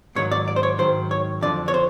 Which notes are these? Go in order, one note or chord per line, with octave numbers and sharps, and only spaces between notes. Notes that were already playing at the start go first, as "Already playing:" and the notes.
G#2 D#3 F#3 C#5
D5
D5
C5
C#5
G#2 D#3 F#3 C5
C#5
F2 D3 F3 D4 D5
C#5
C5